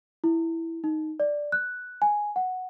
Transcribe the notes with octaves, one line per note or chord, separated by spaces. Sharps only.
E4
D#4
D5
F#6
G#5
F#5